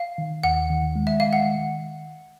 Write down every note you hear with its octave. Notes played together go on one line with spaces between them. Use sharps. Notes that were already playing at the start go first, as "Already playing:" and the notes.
Already playing: F5
D#3
D#2 F#5
D#3
G#3
E5
D#3 F5
F#5